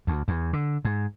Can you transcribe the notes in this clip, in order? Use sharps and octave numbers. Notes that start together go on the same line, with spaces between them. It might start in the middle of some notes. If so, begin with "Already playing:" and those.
D2
E2
D3
G#2